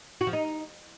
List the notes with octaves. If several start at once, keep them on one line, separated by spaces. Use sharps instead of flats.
F#4
F3
D#4